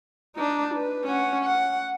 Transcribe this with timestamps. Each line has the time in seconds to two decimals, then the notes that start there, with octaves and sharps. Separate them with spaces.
0.36 D4 D#4
0.75 B4
1.04 C#4 F#5
1.45 F#5